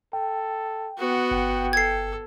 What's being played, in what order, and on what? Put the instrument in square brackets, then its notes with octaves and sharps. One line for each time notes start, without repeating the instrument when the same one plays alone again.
[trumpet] A4 [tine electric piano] G5
[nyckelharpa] B3 F#4
[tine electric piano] G1 [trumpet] G5
[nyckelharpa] A4 [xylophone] G#6 C7